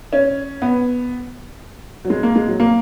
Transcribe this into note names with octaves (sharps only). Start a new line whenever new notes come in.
C#4
B3
F#3
G#3
A#3
G#3
F#3
A#3